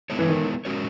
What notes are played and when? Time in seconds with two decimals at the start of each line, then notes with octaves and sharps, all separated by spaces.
0.10 G#3 B3 E4 A4 C#5
0.19 E3
0.28 D#3
0.65 G#3 C#4 F#4 A#4 C#5